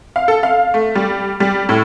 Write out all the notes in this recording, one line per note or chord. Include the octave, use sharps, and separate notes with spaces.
F5
A4
F5
A3
G3
G3
A2